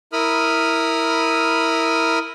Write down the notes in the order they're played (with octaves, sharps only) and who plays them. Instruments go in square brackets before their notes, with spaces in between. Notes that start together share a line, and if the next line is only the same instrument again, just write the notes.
[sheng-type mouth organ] E4 A#4 B5 D#6 F6